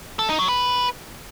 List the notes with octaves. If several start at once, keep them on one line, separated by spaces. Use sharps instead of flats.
A4
D#4
F#3
B4